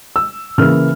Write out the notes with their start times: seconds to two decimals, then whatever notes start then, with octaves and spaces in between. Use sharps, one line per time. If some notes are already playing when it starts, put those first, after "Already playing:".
0.16 E6
0.58 C#3 E3 A#3 F6